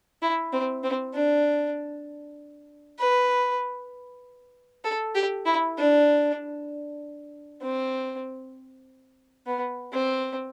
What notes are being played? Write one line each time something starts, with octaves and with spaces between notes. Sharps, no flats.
E4
C4
C4
D4
B4
A4
G4
E4
D4
C4
B3
C4